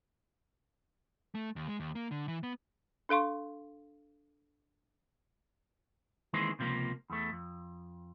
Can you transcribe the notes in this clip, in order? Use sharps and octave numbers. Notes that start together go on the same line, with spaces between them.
A3
D#2
G#3
D#2
A#3
D3
E3
B3
D4 A4 F5 C6 C#6
D#3 E3 G#3 A#3 C4
C#2 C3 F3 G#3 A#3
E2 A3
F2